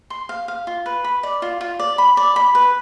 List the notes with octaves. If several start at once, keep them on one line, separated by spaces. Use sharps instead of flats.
C6
F5
F5
F4
B4
B5
D5
F4
F4
D5
B5
D5
B5
B4